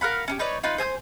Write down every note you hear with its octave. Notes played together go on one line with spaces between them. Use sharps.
A#4 F5 F#5 B5
C#4 D#4 G4
D#4 B4 C#5 D5
D#4 F4 B4
C5 G#5 E6 G6